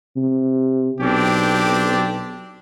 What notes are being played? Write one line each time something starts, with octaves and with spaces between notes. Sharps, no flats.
C3
B1 C4 D4 G4